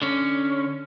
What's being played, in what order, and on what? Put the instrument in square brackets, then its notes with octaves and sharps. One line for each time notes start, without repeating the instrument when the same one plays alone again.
[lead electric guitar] D3 C#4